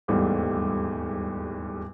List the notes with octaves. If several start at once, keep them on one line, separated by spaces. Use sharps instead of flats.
D#1 E2 G#2 G3 A3